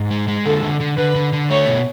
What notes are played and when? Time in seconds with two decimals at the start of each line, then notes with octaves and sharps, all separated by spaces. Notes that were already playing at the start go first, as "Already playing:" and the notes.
Already playing: G#2
0.10 G#3
0.28 G#3
0.46 D3 A4
0.63 D3
0.80 D3
0.98 D3 B4
1.15 D3
1.33 D3
1.50 A3 C#5
1.68 B2